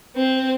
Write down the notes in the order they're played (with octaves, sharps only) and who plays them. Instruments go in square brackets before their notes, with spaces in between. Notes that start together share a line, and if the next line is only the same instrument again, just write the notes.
[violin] C4